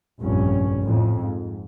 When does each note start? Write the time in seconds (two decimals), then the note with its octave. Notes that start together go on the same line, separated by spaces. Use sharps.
0.20 F1 A#1 G2 C#4
0.83 F2 A2
1.22 G#2